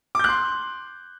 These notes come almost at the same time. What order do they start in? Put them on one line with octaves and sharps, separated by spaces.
D6 G6 F#6 C6